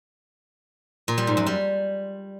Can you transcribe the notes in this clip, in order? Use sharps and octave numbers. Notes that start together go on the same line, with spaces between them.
A#2
G3
G#2
F#2
G3